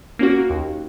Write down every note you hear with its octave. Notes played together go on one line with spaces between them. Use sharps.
A#3 C#4 F#4
D#2